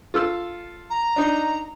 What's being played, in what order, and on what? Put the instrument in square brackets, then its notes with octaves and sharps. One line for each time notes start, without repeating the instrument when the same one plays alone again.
[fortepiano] F4 A4 E6
[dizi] A#5
[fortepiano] D4 D#4